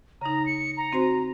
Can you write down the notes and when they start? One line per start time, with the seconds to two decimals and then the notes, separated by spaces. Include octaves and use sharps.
0.21 C#3 D#4 A#5
0.46 C#7
0.77 A#5
0.92 C4 F#4 C5